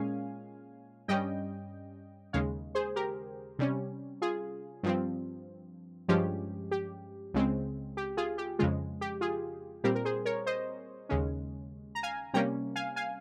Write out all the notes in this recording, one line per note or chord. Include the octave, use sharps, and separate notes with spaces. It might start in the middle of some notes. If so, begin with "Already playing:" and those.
Already playing: A#2 G#3 C#4 F5 G#5
G2 G3 C#4 D#5 G5
D#2 C#3 G#3 C#5 F5
G#4 C5
G4 A#4
C3 G3 C#4
F4 G#4
G2 F3 C4
G2 F3 G#3 C#4 G4
G4
C#2 C#3 G#3 C4
G4
F4 G#4
G4
F2 C#3 G#3 F4
G4
F4 G#4
A#2 G3 C4 G4 A#4
A#4
G#4 C5
A#4 C#5
C5 D#5
D#2 C#3 G#3 C#4
A#5
F5 G#5
C3 G3 A#3 C#4 G5 A#5
F5 G#5
F5 G#5